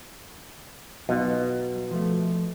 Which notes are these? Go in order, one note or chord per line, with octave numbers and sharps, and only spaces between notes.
B2 F#3 D#4 F4
F3 A3